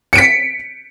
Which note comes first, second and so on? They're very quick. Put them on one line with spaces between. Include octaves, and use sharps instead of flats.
C#7 D7 B6